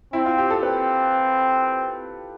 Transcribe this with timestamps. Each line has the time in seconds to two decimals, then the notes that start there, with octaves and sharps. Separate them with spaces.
0.13 C4 E4
0.26 F4
0.38 G4
0.50 A4
0.63 C4 B4